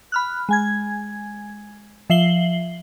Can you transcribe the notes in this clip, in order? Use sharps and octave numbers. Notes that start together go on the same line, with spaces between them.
B5 F6 F#6
G#3 G#5 G#6
F3 E5 C7 F#7 G7